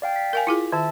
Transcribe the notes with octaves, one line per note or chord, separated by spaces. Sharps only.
D5 F5 G5
B6
A#4 F5 G#5
E4 F4 G#4
D#3 E5 A5 E6